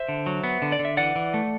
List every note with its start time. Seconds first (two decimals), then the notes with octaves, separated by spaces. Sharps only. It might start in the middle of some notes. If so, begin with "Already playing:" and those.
Already playing: C5 E5
0.09 D3
0.26 F#3
0.44 B3
0.62 D3
0.72 D5
0.79 D3
0.85 E5
0.97 E3 D5 F#5
1.16 E3
1.34 A3